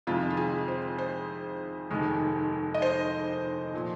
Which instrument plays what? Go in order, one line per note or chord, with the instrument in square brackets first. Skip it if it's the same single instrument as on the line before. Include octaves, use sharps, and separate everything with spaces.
[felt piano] F2 C3 D#3 G#3 F4
F4
G#4
C5
C5
F1 D#2 D#3 G#3
D#5
C5
A#2 F3